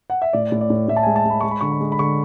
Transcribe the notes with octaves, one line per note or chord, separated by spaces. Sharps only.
F#5
E5
A2 D5
A2
D5
A2
A2 E5
A5
G#5
G#3
A5
G#3 B5
G#3 C#6
B5
D3 C#6
B5
G#3
B5
D3 C#6